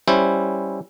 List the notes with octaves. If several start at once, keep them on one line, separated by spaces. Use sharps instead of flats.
G3 C#4 E4 C5